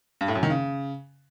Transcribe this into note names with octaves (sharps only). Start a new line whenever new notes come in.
G2
A2
F#2
D#3
C#3